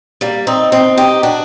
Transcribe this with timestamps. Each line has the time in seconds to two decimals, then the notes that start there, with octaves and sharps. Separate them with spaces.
0.21 G3 A#3
0.47 C4 D#4
0.72 C4 D#4
0.97 D#4 G4
1.23 D4 F#4